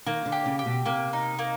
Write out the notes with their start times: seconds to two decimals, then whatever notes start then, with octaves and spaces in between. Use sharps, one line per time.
0.06 D#3 A#3
0.26 D3
0.32 G4
0.46 C#3
0.59 G4
0.66 B2
0.86 C3 A#3
1.13 D#4
1.39 A#3